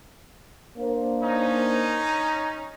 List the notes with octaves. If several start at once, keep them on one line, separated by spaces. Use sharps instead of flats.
A#3 D4 C5
C#4 D#4